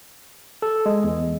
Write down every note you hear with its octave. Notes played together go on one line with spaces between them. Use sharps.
A4
G#3
E2